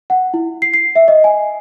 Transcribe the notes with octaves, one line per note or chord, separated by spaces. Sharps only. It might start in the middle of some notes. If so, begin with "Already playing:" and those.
F#5
E4
C7
C7
E5
D#5
G#5